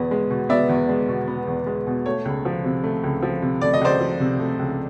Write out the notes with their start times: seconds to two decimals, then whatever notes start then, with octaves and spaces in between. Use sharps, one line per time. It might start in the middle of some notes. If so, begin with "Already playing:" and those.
Already playing: E2 B2 B3
0.11 G#3
0.30 B2
0.49 B3 D5 E5
0.69 E2
0.89 G#3
1.08 B2
1.28 B3
1.47 E2
1.66 G#3
1.87 B2
2.06 A3 C#5
2.25 C#2
2.45 F3
2.64 C3
2.84 A3
3.04 C#2
3.22 F3
3.42 C3
3.61 A3 D5
3.74 D#5
3.81 C#2 C5 D5
4.01 F3
4.20 C3
4.40 A3
4.59 C#2